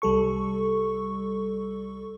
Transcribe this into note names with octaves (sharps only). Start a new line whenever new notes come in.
C2 G3 A4 C#6